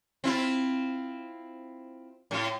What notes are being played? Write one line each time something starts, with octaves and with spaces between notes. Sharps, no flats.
C4 E4 F4
A2 F4